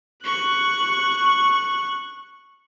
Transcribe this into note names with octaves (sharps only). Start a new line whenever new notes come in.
C#6 F#6